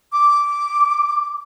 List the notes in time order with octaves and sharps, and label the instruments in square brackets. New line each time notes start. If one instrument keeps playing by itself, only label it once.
[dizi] D6